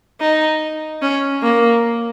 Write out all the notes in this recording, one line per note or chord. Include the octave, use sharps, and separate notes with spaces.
D#4
C#4
A#3